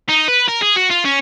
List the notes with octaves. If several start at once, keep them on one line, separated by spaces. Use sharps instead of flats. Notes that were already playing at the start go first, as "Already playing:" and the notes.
D#4
B4
A#4
G#4
F#4
F4
C#4